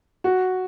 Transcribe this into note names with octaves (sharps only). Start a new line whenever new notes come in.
F#4